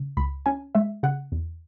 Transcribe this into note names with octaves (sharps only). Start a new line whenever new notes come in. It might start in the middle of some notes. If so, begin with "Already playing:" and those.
Already playing: C#3
C#2 B5
C#4 G#5
G#3 E5
C#3 F#5
E2